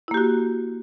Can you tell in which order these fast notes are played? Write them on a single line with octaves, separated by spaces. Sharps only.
E4 A#3 G4 F#4